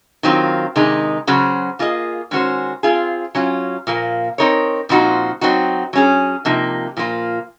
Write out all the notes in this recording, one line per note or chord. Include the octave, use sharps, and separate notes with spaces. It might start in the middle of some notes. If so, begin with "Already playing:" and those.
D#3 F#3 C4 F4
C3 D#3 G#3 D#4
C#3 F#3 C#4 F#4 C5
A#3 F4 G#4 D#5
D#3 G#3 C#4 F#4 C5
C4 F4 G#4
F#3 C#4 F4
A#2 F3 A#3
C4 D#4 A#4 C#5
A#2 F3 C4 D#4 F#4
F#3 C4 D#4 F#4
F#3 C#4 G#4
C3 F3 A#3 D#4
A#2 F3 A#3 F4